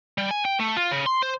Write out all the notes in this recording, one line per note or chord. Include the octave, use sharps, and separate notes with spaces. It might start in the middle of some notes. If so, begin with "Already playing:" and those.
G3
G#5
G5
A3
F4
C#3
C6
C5